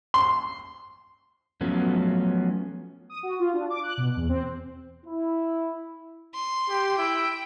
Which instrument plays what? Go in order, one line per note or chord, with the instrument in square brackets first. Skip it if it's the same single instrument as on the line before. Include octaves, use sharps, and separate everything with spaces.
[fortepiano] C6
[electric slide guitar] F3 F#3 A3 B3 C#4
[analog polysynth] D#6
F#4
F4
D4
D6
F#6
B2
E2
C4
[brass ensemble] E4
[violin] C6
[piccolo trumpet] G4
[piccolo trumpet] E4 [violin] G5